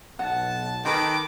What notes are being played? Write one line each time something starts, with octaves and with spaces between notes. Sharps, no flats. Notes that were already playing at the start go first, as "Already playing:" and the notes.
B1 F#5 A5
D#3 A4 B4 G5 D6